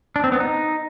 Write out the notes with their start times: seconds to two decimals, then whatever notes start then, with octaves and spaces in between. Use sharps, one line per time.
0.16 D4
0.24 C4
0.32 B3
0.40 D#4